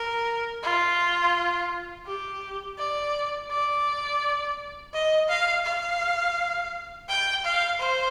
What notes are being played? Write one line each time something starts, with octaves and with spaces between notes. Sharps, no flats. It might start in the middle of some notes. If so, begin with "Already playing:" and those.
Already playing: A#4
F4
G4
D5
D5
D#5
F5
F5
G5
F5
C5